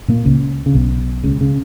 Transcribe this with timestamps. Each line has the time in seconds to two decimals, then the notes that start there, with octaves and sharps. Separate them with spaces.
0.08 A#2 A#3
0.25 C#2 C#3
0.66 C#3
0.75 B1 B2
1.24 C#2 C#3
1.41 C#3